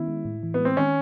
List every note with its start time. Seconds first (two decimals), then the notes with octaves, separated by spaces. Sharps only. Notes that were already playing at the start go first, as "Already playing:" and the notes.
Already playing: D#3 B3 C#4 E4
0.08 G#3
0.25 A2
0.43 E3
0.54 B3
0.60 G#3
0.65 C4
0.77 D#3 C#4